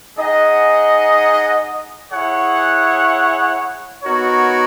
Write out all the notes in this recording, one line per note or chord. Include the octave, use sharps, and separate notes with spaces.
D#4 G#4 D#5 F#5
E4 G#4 C#5 F#5
B3 D#4 F#4 A#4 C#5